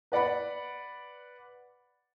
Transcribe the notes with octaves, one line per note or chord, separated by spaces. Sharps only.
B4 D5 F#5 B5